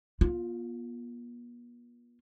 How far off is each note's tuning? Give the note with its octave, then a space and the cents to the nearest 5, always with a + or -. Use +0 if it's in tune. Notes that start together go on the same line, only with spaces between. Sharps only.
B3 -45 F4 +5